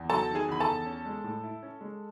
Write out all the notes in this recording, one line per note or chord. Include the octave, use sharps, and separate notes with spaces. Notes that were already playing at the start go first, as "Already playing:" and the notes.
Already playing: E2
F#3 A4 A5
D#3
G#4 G#5
E2 B5
A4 A5
E2
C#4
G#3
A2
E4
C#4
G#3